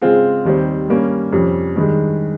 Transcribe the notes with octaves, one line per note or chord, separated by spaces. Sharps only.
C#3 G#3 C4 F4 G#4
D#2 D#3 G3 C4
G2 G3 A#3 C#4
F2 C3 G3 C#4
G2 D#3 G#3